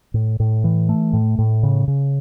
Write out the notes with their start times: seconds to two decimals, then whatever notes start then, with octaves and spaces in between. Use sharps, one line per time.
0.14 A2
0.40 A2
0.64 E3
0.89 A3
1.13 A2
1.39 A2
1.63 C#3
1.88 C#3